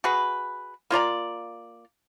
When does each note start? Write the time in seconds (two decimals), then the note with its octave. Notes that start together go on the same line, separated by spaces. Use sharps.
0.04 F#4 G#4 B4
0.90 A#3 F4 D5 A#5